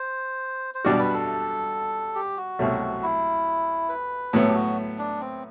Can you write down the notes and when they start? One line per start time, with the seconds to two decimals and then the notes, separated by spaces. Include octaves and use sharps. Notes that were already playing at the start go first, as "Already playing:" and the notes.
Already playing: C5
0.75 C5
0.85 B2 G3 D4 F#4 D5
0.99 B4
1.14 A4
2.15 G4
2.37 F#4
2.59 C2 B2 F#3 A3
3.03 E4
3.89 B4
4.33 A2 F#3 B3 A4
4.48 G4
4.55 F#4
4.98 D4
5.20 C4